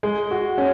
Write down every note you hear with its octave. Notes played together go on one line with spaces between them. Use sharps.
G#3
F#4
C#4